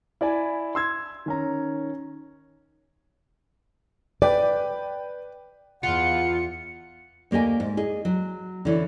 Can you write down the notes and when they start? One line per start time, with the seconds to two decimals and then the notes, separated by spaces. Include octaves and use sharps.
0.21 E4 D5 E5 G#5 B5
0.75 C6 E6 G#6
1.26 D#3 C#4 A#5
4.22 B4 D5 G5
5.83 E2 F4 F#5 C#7
7.31 D2 A#3 G4 D#5 G#5
7.60 G#2
7.77 G#4 D#5
8.05 F#3
8.65 D3 E3 C#4